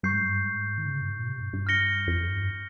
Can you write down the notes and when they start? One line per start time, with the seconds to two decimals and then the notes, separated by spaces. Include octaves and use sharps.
0.03 G2 C#6 G6 C7
0.14 G#2
0.24 G2
0.44 G#2
0.78 D#3
0.86 C#3
1.01 G2
1.10 G#2
1.19 A#2
1.27 C3
1.40 G2
1.53 G2
1.67 F6 A#6 C#7 G7
2.07 F2
2.28 G2